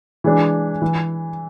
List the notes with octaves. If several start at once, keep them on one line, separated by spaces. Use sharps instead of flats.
E3 G#3 D4
E3